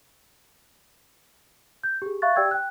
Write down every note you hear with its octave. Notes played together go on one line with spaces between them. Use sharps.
G6
G4 G#4
E5 F5 C#6 F#6 A6
G4 D5 G5 E6 G#6
G5 F#6